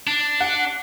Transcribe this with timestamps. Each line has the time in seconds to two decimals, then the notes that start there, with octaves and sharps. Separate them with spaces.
0.07 D4
0.40 F#5